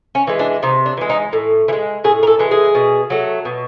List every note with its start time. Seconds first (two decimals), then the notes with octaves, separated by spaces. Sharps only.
0.15 C#4
0.27 E3 G#3
0.39 D4
0.63 C3 D#4
0.86 D4
0.97 E3 G#3
1.09 D#4
1.33 A2
1.68 E3
1.73 G#3
2.04 A2 G#4
2.23 A#4
2.27 A4
2.39 E3 G#3
2.51 G#4
2.75 B2
3.10 F#3 A3
3.45 B2